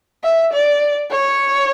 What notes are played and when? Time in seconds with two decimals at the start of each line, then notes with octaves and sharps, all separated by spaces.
0.24 E5
0.53 D5
1.11 C#5